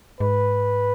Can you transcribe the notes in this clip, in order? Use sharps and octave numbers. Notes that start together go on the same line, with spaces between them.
G#2 B4